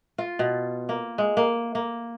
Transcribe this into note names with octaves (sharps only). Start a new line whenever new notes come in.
F4
B2
A#3
G#3
A#3
A#3